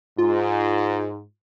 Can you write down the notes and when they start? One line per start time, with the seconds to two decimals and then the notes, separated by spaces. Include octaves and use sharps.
0.18 G#2 F4